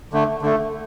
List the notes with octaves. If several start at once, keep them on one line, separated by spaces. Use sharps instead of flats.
D3 A3
D3 A3